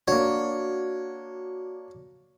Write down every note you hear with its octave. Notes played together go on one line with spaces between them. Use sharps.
A#3 D4 F#4 C#5